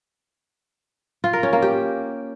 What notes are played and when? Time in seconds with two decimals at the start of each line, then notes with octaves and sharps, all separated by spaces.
1.24 F4
1.33 A#4
1.43 C#4
1.53 A#3
1.62 G4